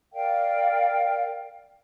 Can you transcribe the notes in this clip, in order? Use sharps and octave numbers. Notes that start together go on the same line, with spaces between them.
A#4 D5 F5 G5